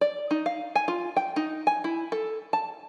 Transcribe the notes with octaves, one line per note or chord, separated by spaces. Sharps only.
D5
D#4
F5
G#5
F4
G5
D#4
G#5
E4
A4
A5